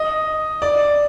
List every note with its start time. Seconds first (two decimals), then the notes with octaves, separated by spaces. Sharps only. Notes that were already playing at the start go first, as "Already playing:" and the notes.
Already playing: D#5
0.62 D5